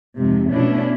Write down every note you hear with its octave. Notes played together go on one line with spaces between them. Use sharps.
F2 G#2 C3
B2 A3 C#4 D4 E4